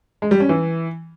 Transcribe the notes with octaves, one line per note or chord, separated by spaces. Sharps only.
G#3
G3
C#4
E3